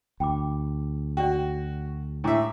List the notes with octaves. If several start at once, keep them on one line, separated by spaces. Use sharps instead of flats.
D2 G5 B5 D6
F#4 D5 G5
A2 D4 E5 A#5 D6